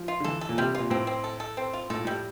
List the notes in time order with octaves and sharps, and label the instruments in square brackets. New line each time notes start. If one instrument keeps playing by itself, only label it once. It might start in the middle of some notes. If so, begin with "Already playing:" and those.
Already playing: [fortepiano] F3
[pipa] F4
[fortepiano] D3
[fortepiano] E3 [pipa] A4
[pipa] A4
[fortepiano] A#2
[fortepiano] C3 [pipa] G3
[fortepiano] A#2 [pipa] F4
[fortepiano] A2 [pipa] C4
[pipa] C4
A4
A4
C4
F4
[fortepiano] A2 [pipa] A4
[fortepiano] A#2
[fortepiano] A2 [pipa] G3